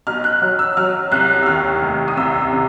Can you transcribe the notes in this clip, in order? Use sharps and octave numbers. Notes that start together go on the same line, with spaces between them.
B1 F6
F#6
F#3
E6
F#3 F6
C2 F#6
E6
D#2 F6
F1
D#6
C2 E6
C3